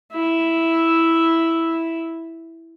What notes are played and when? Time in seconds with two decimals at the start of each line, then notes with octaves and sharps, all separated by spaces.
0.13 E4 E5